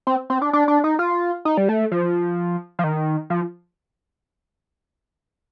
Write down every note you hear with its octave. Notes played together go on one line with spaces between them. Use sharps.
C4
C4
D4
D4
D4
D#4
F4
D#4
G3
A3
F3
F3
D#3
F3